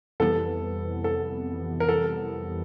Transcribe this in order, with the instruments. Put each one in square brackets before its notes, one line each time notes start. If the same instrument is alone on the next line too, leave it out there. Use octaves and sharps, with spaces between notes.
[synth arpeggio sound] F2 C3 E3 G3 B3 [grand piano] A4
[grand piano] A4
A#4
A4